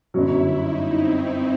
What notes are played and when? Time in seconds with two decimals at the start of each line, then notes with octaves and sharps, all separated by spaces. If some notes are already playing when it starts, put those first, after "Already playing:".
0.14 G1 F#2 F#3 E4
0.55 D#4
0.95 C4